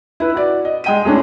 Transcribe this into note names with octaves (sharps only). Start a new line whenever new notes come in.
E4 B4
F#4 D5
D#5
G#3 G5 D#7
G#3 A3 C#4 D4 E4